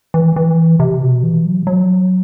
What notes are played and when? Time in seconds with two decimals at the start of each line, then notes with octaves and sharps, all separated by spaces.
0.14 E3
0.36 E3
0.80 C3
1.02 B2
1.23 E3
1.45 F#3
1.67 F#3